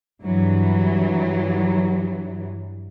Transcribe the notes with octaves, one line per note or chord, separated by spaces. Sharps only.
G2 E3 F#3